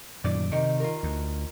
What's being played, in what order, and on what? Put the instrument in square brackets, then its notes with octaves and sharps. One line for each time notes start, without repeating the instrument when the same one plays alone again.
[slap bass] F#2 A#2 D#3 [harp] D5
[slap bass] C3 [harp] D#3
[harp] F4 A#4
[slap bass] D2